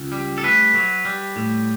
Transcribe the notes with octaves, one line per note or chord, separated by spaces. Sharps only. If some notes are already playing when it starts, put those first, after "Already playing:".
Already playing: C#2
G3
A4
A3 B4
F#3
G3
A2